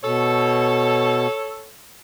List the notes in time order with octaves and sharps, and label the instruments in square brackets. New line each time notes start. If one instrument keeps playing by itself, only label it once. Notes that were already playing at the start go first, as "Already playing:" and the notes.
[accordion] B2 [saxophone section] A4 C#5